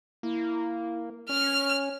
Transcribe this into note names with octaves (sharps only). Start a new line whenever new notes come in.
A#3 E4
C#4 C#5 F6